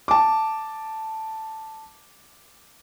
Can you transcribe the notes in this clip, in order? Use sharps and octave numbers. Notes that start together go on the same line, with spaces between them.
A5 D6